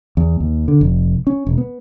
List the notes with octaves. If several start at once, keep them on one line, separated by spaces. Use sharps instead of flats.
E2
D#2
D3
F1
C#4
E1
B3